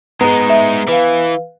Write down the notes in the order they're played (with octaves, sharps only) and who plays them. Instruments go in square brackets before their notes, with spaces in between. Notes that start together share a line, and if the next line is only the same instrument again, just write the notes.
[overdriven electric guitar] G#3 D#4 [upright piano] B3 [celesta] G#4 A#5
[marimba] E5
[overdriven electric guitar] E3 [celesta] B4 F5